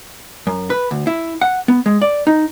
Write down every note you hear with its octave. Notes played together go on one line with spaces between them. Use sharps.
F#2
B4
D2
E4
F#5
B3
G#3
D5
D#4